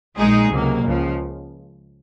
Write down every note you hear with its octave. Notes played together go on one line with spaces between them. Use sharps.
A#1 A#2 G#3 D#4 G#4
C#2 C3 F#3 A#3
C#2 C#3 F3